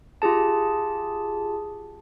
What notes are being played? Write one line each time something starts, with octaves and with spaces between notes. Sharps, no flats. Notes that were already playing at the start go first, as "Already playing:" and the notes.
F4 G4 G#4 A5